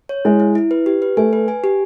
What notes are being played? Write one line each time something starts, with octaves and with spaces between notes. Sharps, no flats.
C#5
G#3 E4
E4
E4
B4
G4
B4
A3 G#5
B4
G#5
G4